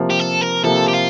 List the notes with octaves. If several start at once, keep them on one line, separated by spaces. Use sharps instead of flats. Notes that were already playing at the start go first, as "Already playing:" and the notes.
Already playing: C3 F3 A#3
G4
A4
A#4
C3 F3 A#3 A4
G4
F4